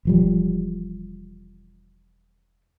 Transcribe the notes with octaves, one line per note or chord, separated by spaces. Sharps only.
E1 F3 G3